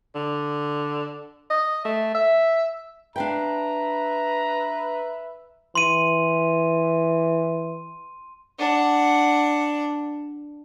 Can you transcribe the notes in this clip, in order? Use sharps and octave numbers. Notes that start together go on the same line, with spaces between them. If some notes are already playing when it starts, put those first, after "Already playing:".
D3
D#5
A3
E5
D4 B4 E5 F5 G5 A#5
E3 C6 D#7
D4 F#5